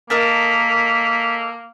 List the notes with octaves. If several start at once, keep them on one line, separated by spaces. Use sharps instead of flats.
A#3 A4 A#4 D#5 B6